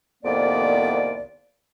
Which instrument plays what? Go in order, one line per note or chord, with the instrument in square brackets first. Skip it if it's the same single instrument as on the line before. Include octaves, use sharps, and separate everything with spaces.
[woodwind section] C2 F2 D#3 A#3 B3 D5